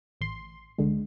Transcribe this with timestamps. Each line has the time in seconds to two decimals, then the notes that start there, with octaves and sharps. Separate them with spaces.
0.21 A1 C6
0.78 C#2 D3 G#3